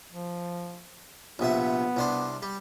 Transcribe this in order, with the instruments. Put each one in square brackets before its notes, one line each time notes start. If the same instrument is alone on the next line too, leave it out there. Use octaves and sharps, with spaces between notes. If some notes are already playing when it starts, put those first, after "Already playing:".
[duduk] F3
[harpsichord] A#1 C3 E5 [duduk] B3
[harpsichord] C2 D4 C5
G3